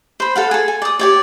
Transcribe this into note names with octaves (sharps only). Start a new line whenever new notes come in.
C5 B5
A4 F5 F#5
G#4 A4
G#5
D5 D#6
G4 C#5 D5